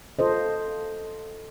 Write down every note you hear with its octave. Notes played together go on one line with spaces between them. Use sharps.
F4 A4 C5 D#5